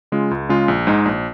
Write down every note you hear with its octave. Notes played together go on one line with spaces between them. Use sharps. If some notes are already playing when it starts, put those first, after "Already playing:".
C#3 G#3 F4
C#2
C#3 G#3 F4
A#1
G#2 G#3 D#4
A#1